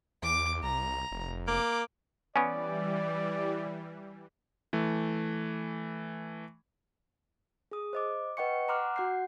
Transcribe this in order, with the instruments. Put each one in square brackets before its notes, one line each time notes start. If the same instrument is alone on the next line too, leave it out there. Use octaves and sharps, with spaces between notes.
[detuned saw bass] E2 [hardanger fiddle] D6
[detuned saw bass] C2 [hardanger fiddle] A#5
[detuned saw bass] F1
[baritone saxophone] A#3 [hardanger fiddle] D6
[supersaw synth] E3 G3 [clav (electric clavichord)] B3 C#4 [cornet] D5 [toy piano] G#5
[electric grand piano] E3 A3
[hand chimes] G#4 D#6
C5 D#5 D6
B4 D#5 F#5 G5 C#6 C#7
F#5 A#5 C6 D6 F6 F#6
F#4 F#5 G6 C7